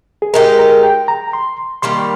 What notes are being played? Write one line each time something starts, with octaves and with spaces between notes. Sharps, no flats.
G#4
G#3 D#4 G4 A#4
A#4
G5
A#5
C6
D#3 G3 A#3 C6